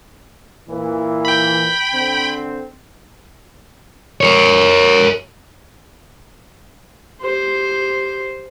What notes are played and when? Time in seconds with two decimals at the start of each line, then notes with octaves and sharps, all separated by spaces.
0.69 A#2 E3
1.25 G5 B5
1.94 D3 C4
4.21 A#4 C#5
7.21 G4 C5